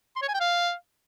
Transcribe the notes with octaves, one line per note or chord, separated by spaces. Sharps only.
C6
C#5
G#5
G5
F5